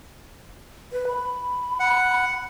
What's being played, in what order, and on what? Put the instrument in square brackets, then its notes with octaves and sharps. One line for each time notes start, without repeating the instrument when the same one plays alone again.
[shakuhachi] B4
B5
[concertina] F#5